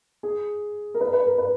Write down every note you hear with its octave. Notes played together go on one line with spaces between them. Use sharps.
G#4
A#4
B4
B4
A#4
B4